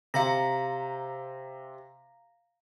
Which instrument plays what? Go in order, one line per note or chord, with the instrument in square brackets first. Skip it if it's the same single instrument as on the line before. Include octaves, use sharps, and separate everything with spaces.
[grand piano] C3 [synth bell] F5 A#5 A#6